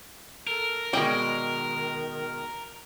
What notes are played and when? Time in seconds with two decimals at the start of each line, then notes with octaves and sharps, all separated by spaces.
0.47 A4 A#4
0.93 B2 D#3 G#3 D5 G5